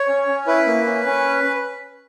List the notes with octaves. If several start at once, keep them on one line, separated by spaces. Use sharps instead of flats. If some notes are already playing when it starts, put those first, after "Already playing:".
Already playing: C#5
C#4
C#4
E4 B4
A#3
C#4
C#4